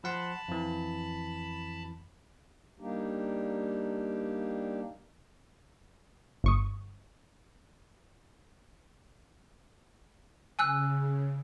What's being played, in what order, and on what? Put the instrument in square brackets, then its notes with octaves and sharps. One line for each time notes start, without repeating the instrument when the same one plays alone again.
[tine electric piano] F3 F#5 C6 [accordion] A5 B5
[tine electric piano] F2 E3
[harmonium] G3 A#3 D4 D#4 G4
[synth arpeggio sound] G1 C#6 D#6
[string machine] C#3 [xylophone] G#5 E6 F#6